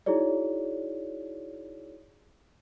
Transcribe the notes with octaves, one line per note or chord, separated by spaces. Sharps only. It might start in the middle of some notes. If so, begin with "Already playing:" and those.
D#4 E4 F#4 G#4 C#5 D5